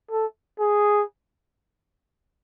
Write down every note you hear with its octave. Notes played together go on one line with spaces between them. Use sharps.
A4
G#4